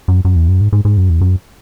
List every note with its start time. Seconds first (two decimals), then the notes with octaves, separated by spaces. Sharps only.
0.08 F#2
0.25 F#2
0.36 E2
0.48 F#2
0.61 G#2
0.73 G#2
0.85 G#2
0.97 F#2
1.10 E2
1.21 F#2